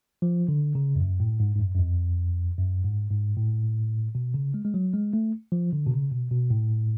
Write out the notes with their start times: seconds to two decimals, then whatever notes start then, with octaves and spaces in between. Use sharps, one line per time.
0.22 F3
0.48 D3
0.75 C#3
0.96 F2
1.01 F#2
1.20 A2
1.40 G#2
1.55 G#2
1.60 F#2
1.75 F#2
1.79 F2
2.58 F#2
2.84 G#2
3.10 G#2
3.37 A2
4.15 B2
4.34 C#3
4.54 G#3
4.65 G#3
4.74 F#3
4.94 G#3
5.13 A3
5.52 F3
5.73 D3
5.86 B2
5.91 C#3
6.12 B2
6.31 B2
6.50 A2